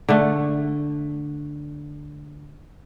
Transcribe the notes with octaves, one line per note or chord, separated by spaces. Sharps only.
D3 A3